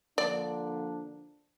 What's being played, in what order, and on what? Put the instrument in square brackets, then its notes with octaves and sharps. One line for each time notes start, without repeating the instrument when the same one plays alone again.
[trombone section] D3 F3 A#3 D4 [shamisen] D5